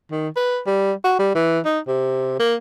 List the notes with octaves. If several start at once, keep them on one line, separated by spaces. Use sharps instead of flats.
D#3
B4
G3
F#4
G3
E3
D#4
C3
A#3